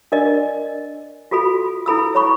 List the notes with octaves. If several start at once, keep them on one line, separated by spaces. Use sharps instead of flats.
D4 A#4 D5 D#5
F4 F#4 A4 B5
E4 A4 B5 E6
C#5 B5 C#6